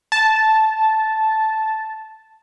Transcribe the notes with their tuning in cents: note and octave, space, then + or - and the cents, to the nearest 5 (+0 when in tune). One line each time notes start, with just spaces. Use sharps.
A5 -5